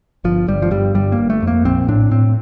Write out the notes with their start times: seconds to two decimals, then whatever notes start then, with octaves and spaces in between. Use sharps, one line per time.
0.24 G1 F3
0.48 G1 G3
0.62 F3
0.71 G2 G3
0.95 G1 G3
1.12 A#3
1.18 G1
1.30 A3
1.42 F2
1.47 A#3
1.65 A#1 C4
1.88 A2 D4
2.11 A2 C4